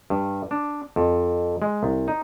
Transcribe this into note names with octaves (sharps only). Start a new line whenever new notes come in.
G2
D4
F2
G#3
C2
D#4